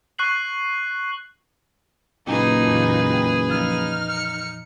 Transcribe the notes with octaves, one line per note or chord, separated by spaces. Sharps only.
C#6 F#6 C7 F#7
F#1 A#2 G#3 A#3 D#4 F4 G#4 B4
F2 A#2 E3
G5
F3 D#4 E6 F6
C#7